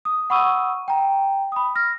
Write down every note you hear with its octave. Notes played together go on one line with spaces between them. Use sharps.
D#6
F#5 B5 C#6 D#6 E6 D#7
G5 A#5
B5 D#6
F6 A#6